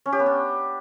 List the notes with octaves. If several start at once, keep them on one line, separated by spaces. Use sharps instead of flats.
C#4
G4
B3
D4